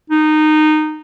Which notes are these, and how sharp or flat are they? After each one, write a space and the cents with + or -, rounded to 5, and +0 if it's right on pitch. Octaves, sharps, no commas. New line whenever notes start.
D#4 -15